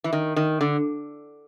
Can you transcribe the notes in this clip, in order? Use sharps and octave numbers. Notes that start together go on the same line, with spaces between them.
E3
D#3
D#3
D3